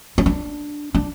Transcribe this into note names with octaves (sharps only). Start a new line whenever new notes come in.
C#4
D4
D4